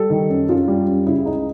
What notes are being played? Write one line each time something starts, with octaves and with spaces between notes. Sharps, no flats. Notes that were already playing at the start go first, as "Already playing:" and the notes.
Already playing: G3 A4
D#3
F#2
F#2 F4
G3
F#2
C#3 E4
C#2 D#4